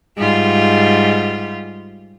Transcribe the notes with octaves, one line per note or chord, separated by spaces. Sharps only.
G#2 G3 F4